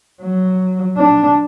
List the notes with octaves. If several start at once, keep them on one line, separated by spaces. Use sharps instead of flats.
F#3
D4